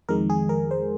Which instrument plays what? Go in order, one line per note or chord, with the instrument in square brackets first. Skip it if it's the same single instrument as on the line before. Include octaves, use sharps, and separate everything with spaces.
[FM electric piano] F2 D#3 G#3 A#4
G#4
A#4
C5